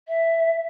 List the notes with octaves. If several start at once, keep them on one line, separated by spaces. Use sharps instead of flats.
E5